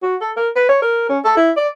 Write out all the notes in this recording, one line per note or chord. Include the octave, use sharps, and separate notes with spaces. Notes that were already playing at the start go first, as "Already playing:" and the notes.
F#4
A4
A#4
B4
C#5
A#4
C#4
A4
E4
D5